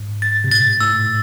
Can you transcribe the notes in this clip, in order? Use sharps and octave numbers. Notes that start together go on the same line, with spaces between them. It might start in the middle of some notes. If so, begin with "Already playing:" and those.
Already playing: G#2
A6
C3
A2 A6
A2 E6